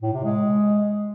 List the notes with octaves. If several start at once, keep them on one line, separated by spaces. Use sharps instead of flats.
A2
C3
G#3